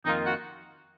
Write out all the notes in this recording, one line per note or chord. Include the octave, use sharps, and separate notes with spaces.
F2 D#3 A#3 D#4 F4
F#4